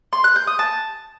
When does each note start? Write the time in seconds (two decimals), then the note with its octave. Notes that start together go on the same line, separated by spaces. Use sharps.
0.13 C6
0.24 F#6
0.36 G6
0.47 D#6
0.59 A5